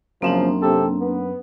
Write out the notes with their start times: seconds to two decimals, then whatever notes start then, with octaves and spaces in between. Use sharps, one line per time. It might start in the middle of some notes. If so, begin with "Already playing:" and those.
0.22 F#2 C#3 F3 A#3 C4 D4
0.62 C3 G4 A4
1.00 B3